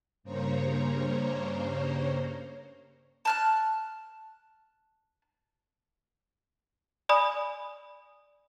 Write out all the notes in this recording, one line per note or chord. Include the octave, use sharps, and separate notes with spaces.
G2 C#3 A#3 C5 C#5 A#5
A5 F6 F#6
D5 G#5 B5 D#6